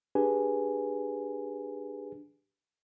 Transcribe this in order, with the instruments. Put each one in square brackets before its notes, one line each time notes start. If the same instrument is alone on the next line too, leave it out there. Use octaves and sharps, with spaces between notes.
[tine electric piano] D4 G4 G#4 B4 G#5